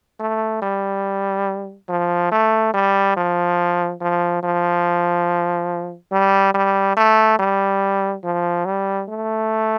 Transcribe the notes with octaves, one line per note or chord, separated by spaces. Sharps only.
A3
G3
F3
A3
G3
F3
F3
F3
G3
G3
A3
G3
F3
G3
A3